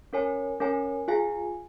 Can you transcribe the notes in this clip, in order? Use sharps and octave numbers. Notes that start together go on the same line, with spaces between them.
C#4 A#4 C#5 G#5
C#4 A#4 C#5 G#5
F4 G#4 F5 G#5